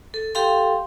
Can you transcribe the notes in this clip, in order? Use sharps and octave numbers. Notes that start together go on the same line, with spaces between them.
A4
G4 A4 F5 G5 C6